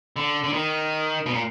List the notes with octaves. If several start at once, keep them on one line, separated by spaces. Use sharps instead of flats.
D3
D3
D#3
B2
A#2